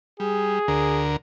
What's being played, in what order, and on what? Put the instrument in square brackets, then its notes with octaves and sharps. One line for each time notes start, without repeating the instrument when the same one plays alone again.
[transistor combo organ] G3 [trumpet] G#4
[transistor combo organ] D2 D3 A#4